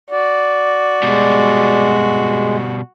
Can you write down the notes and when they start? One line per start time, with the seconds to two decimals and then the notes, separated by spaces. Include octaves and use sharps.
0.10 F#4 D5
1.03 B2 G3 G#3